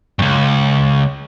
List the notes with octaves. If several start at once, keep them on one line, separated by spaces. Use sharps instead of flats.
C#2 G2